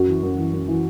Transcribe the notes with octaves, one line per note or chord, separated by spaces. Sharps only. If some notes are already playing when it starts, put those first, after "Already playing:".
Already playing: F#2 F#4
E3
F#2
E3
F#2
E3